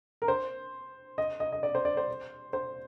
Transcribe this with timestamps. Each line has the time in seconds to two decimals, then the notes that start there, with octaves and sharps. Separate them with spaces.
0.22 A#4
0.28 C5
1.18 D#5
1.40 D#5
1.52 D#5
1.63 D5
1.75 C5
1.85 D5
1.97 C5
2.53 C5